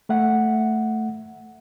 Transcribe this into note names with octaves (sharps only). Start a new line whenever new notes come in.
A3 E5 F#5